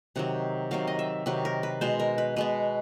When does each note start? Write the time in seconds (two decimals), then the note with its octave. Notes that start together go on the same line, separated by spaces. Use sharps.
0.16 C3 D#3 F#3 F#5
0.71 C3 D#3 F#3 F5
0.87 D#5
0.99 E5
1.26 C3 D#3 F#3 B4
1.45 A#4
1.63 B4
1.81 B2 G#3 B3 C5
2.00 A#4
2.18 B4
2.36 B2 G#3 B3 B4